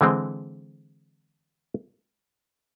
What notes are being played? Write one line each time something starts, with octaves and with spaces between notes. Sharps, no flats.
D3 E3 G#3 C4